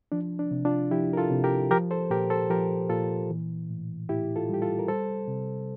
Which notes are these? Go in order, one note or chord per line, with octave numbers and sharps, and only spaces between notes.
F3 D4
D4
C3
D4 F4
F3 E4 G4
A#4
F4 A4
C3
G4 A#4
F3 G4 A#4
A4 C5
A#2 G4 A#4
A4 C5
F3 G4 A#4
A#2 F4 A4
E3
A2
A2 E4 G4
F4 A4
G3 G4
F4 A4
A#4
G3 A4 C5
C3